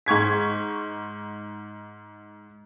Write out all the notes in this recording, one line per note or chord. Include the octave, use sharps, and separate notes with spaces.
G#2 C#6 G#6 B6